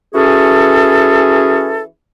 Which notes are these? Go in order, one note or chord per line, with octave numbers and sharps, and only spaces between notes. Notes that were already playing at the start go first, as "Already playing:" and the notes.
E3 C#4 F#4 G#4 A4